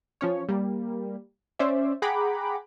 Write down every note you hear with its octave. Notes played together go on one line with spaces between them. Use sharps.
F3 C#4 C#5
G3 A#3
C#4 C5 D5 E5
G#4 F#5 G5 A#5 B5 D6